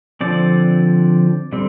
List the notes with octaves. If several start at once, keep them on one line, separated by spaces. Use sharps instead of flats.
D3 F3 C4 D5
D3 G3 C4